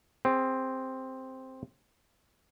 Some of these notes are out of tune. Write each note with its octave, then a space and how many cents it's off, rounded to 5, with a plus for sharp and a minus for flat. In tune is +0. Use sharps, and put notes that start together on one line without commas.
C4 +0 G#4 -20